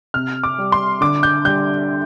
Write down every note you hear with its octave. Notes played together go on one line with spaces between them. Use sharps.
C3 F6
D6
G3
C6
D3 D6
G6
G3 G6